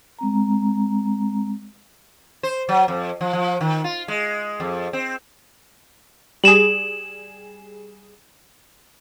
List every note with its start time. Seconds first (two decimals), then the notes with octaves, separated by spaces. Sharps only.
0.19 G#3 C4 A#5
2.43 C5
2.69 F#3
2.88 F2
3.21 F3
3.33 F3
3.61 D#3
3.84 F4
4.08 G#3
4.60 F2
4.93 C4
6.44 G3 G#4 E7 F#7